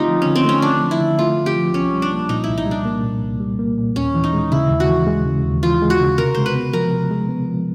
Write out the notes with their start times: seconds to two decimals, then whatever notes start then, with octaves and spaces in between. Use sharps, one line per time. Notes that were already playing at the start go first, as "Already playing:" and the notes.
Already playing: D3 A3 C4 D#4 F4 G4
0.08 F3
0.22 D3 C#4
0.35 C4
0.45 A3 C#4
0.62 C4 D4
0.82 F3
0.91 E4
1.00 D3
1.19 A3 F4
1.36 C4
1.46 G4
1.56 F3
1.73 C2 C#4
1.93 G3
2.02 D4
2.12 A#3
2.29 A#2 D#4
2.44 C2 E4
2.58 D#4
2.66 G3
2.71 D4
2.85 A#3
3.04 A#2
3.23 C2
3.40 G3
3.59 A#3
3.78 A#2
3.96 D#2 C#4
4.15 E3
4.24 D#4
4.33 G#3
4.52 C#3 E4
4.70 D#2
4.80 F#4
4.89 E3
5.07 G#3
5.26 C#3
5.44 D#2
5.63 E3 F4
5.82 G#3
5.90 F#4
6.01 C#3
6.18 C3 A#4
6.35 G#3 C5
6.46 B4
6.55 B3
6.73 F3 A#4
6.93 C3
7.11 G#3
7.29 B3
7.49 F3